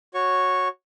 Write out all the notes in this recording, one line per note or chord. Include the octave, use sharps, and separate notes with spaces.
F#4 C#5 C#6